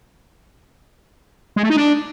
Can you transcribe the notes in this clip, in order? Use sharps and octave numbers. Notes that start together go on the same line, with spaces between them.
G#3
A3
D#4
D4